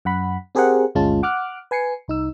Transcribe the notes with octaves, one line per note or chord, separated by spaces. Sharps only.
F#2 F#5 B5
C4 G4 G#4 A#4 C5 F#5
G1 D2 G#3 C#4 F4 A5
F#5 D6 F6 F#6
B4 G#5 C7 C#7
C2 D#4 E6